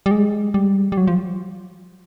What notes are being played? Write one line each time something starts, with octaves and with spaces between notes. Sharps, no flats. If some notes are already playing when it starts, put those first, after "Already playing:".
G3
G#3
G3
G3
F#3
F3